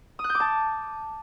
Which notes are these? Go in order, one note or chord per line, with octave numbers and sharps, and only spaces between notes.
D#6
F#6
G6
D6
A5